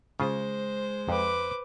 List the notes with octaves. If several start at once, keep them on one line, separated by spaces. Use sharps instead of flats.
C#3 G#3 F4 G#4 C5
F2 B4 D6